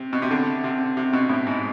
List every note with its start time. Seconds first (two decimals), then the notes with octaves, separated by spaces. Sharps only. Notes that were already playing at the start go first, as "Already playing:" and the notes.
Already playing: C3
0.13 B2
0.22 C3
0.31 D3
0.64 C3
0.97 C3
1.13 B2
1.30 A2
1.47 G#2